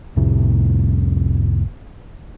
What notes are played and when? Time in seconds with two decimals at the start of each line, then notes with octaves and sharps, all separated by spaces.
0.16 C2 F2 A2 C3